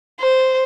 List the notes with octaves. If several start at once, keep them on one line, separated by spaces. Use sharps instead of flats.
C5